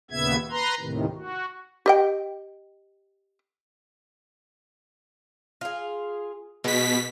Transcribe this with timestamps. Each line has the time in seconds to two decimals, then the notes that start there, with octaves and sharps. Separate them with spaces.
0.11 D#2 A#2 C#3 B3 E5 G#6
0.51 B4 A#5 C6
0.80 D#2 A2 C3 D#3
1.15 F#4
1.86 G4 D#5 G5
5.61 F4 G#4
6.64 B2 G#3 B6